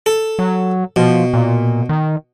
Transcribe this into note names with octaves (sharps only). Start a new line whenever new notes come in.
A4
F#3
B2 F3
A#2
D#3